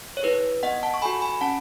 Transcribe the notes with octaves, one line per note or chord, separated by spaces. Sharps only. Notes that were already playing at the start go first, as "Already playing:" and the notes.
C#5
E4 G#4 B4
B3 D#5 F#5
F#5 A5
C#6
F#4 A4 G#5 B5
G#5 B5
C#4 F#5 A5